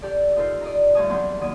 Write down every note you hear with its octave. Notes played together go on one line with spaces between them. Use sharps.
G4 A4 D5
D#4 F4 A4 A#4 C5
D5 D#5 A#5
D2 G2 D#4 C#5 A5 D#6
E2 F#3 C4 D4 C6 G6
D#2 D#3 F#3 D5 D#6